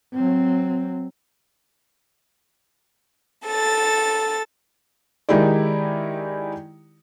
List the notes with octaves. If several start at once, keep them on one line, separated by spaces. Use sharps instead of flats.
F#3 C4
A4 A6
D#3 G#3 D#4 E4 G4 D5